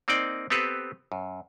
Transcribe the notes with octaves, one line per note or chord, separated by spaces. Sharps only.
A#3 C4 D#4 D5 G5
B3 C4 G4 A4 B4
F#2